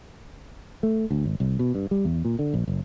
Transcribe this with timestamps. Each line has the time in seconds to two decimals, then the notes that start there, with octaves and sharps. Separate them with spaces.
0.83 A3
1.11 D2
1.26 G#1
1.40 C2
1.59 B2
1.75 G2
1.91 G3
2.05 E2
2.25 A#2
2.39 D3
2.54 A#1
2.68 F#1